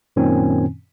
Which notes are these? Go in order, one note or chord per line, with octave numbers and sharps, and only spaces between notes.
F#2 A#2 D#3 C4 C#4 G#5